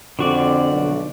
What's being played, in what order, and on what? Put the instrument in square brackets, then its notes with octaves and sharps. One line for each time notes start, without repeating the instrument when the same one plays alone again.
[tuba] F2 [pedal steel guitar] D3 F#4 D5
[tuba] B1